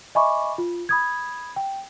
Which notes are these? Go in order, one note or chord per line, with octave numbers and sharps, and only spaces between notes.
D#5 E5 G#5 B5 C#6 D6
F4
B5 D#6 G#6
G5